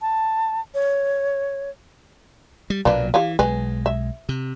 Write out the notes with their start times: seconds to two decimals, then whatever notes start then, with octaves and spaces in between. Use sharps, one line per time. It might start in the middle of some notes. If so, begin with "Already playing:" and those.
0.01 A5
0.74 C#5
2.70 G3
2.85 B1 A#2 F#3 A#3 D4 B4
3.14 E3 G4 C#5 F5
3.39 B1 G#3 B4 G#5
3.86 E5
4.29 C3